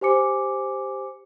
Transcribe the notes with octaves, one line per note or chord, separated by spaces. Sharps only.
G4 C5 G#5 D6 C#7